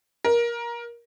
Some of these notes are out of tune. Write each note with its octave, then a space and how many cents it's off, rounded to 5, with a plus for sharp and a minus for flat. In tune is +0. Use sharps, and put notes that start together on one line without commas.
A#4 +20